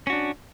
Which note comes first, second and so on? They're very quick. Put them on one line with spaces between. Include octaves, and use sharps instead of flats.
C#4 F#4 D4